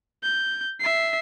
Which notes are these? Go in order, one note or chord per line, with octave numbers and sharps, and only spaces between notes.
G6
E5 C7